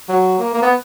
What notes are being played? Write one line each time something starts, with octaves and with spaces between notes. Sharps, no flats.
F#3
A#3
A#3
B3